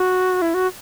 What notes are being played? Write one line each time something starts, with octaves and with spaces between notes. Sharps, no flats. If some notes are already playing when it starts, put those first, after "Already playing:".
Already playing: F#4
E4
F#4